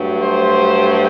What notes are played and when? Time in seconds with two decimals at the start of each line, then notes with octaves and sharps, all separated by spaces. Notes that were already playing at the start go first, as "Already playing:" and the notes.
Already playing: G2 F#3 A3
0.22 C5